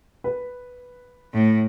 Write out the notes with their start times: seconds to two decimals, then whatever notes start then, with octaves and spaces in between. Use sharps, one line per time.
0.24 B4
1.34 A2